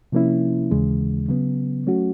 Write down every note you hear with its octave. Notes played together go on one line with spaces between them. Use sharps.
C3 F3 A#3 C#4 E4
D#2 C#3 E3 G#3
C#3 F#3 B3
F#3 A3 C#4 F#4